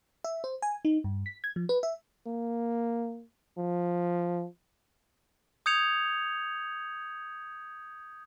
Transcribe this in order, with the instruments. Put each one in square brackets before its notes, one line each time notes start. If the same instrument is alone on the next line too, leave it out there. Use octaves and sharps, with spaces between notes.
[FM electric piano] E5
C5
G#5
D#4
G2
B6
G#6
F3
B4
E5
[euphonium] A#3
F3
[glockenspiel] D#6 G6 G#6 C#7 F7